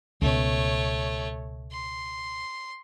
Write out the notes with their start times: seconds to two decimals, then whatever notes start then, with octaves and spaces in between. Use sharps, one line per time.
0.22 C#2 B2 A3 C#5
1.72 C6